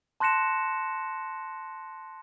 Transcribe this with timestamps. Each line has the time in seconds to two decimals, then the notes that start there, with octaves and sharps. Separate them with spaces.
0.20 A5 C6 F#6 A#6 C#7 E7